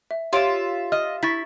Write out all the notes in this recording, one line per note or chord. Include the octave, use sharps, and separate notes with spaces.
E5
F4 G4 C#5 E5 D7
D#5 F6
E4 C#6 A6 B6